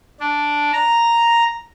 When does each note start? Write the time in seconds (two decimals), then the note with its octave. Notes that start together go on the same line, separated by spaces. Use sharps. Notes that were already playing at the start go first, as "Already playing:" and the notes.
0.20 D4
0.73 A#5